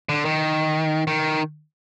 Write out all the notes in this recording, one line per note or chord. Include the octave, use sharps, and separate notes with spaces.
D3
D#3
D#3